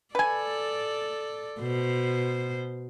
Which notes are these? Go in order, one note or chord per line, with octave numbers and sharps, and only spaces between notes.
A4 B4 D5 G#5
B2 C5